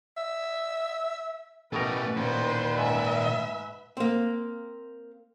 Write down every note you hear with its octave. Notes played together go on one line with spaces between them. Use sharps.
E5
A1 B2 A3 G4 A#4 B4
A#2 D#3 C5
G#2 E5
A#3 C4